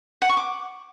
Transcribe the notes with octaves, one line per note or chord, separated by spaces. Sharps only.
F#5
C#6
D6